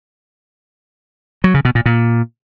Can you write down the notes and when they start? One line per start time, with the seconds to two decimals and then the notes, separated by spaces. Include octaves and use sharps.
1.44 F#3
1.54 C#3
1.65 B2
1.75 A#2
1.86 A#2